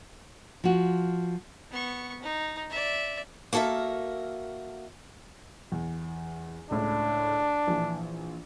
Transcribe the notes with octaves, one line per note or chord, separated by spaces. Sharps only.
F3 F#4
B3 C#6
D#4
D5 E5
A#3 F#4 A4 A#4 E5
E2
C#2 A2 D4
A#1 E3